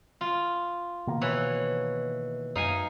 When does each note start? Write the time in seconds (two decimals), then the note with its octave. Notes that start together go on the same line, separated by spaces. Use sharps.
0.21 F4
1.07 B2 D#3 A#3
1.21 E3 C#5
2.55 F#2 D#4 F5 G#5